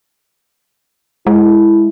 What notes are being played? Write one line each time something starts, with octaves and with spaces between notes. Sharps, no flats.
G#3 E4